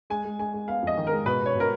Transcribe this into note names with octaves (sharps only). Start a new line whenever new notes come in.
G#3 G#5
G#3
G#3 G#5
G#3
B3 F5
F2 D#5
D#3
G#3 A#4
B2 B4
B2 C#5
B2
A#4